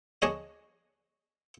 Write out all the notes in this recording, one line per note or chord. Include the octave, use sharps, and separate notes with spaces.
D4 G#4 C#5 D#5